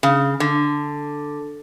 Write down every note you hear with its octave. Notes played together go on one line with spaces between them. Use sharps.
C#3
D3